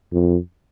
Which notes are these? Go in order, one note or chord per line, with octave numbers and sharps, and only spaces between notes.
F2